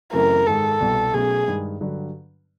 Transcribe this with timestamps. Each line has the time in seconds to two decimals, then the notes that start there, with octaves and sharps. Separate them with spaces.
0.13 F#2 C#3 E3 A3 C4 A#4
0.47 G#2 D#3 G#3 A4
0.80 C2 B2 G3
1.14 B2 F#3 A3 C#4 G#4
1.48 G2 D#3 G#3
1.81 G2 D3 F#3